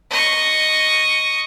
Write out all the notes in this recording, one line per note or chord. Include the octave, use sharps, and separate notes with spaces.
D#5 C#6